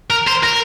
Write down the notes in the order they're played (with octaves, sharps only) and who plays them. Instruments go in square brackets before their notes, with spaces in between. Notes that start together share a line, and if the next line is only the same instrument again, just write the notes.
[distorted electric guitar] A#4
C5
A#4